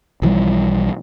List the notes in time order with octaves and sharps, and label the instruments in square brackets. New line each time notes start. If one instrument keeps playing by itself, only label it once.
[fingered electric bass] B1 E3 F3 G3